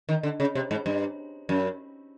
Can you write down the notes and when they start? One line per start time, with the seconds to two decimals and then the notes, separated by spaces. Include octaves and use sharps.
0.09 D#3
0.23 D3
0.40 C#3
0.55 C3
0.71 G#2
0.86 G2
1.49 F#2